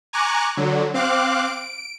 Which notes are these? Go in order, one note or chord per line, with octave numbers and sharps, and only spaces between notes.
G#5 A#5 C#6 D6 F#6
D3 F#3
C4 F5 D6 F#6
D7